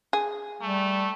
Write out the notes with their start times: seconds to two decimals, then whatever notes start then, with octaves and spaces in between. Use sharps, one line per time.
0.13 G#4
0.62 G3 A3